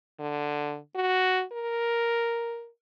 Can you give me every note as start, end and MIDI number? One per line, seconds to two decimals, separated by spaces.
0.19 0.78 50
0.95 1.43 66
1.52 2.69 70